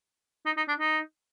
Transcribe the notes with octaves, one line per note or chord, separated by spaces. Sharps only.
D#4
D#4
D4
D#4